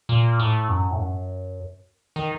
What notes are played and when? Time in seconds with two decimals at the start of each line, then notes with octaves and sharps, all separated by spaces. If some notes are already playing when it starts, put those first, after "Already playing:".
0.09 A#2
0.40 A2
0.69 F#2
0.91 A2
0.98 F#2
2.16 D#3